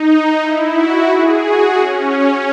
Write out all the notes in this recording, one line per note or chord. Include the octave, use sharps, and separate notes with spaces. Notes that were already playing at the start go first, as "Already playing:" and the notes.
Already playing: D#4
E4
F#4
G#4
F#4
C#4